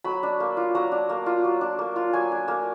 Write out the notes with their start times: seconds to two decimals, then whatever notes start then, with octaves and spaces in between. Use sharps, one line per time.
0.04 F#3 B5
0.23 D4
0.40 A#3
0.57 F4
0.75 F#3 A#5
0.92 D4
1.09 A#3
1.26 F4
1.44 F#3
1.61 D4
1.79 A#3
1.96 F4
2.13 F#3 G#5
2.32 D4
2.48 A#3